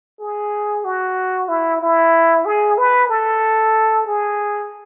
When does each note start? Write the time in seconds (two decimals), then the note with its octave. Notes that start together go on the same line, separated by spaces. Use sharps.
0.20 G#4
0.85 F#4
1.49 E4
1.81 E4
2.45 G#4
2.78 B4
3.10 A4
4.07 G#4